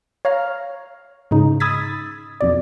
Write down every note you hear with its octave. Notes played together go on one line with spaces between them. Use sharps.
C#5 F5 A#5 F6
G#2 C#3 D#4
B5 D#6 E6 G#6 A6 B6
F2 B2 D5